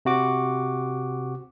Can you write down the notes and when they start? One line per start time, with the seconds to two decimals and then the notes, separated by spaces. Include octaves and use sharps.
0.05 C3 F#4 D6